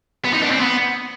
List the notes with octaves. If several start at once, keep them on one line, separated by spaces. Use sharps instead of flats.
B3
D#4
D4
C4
B3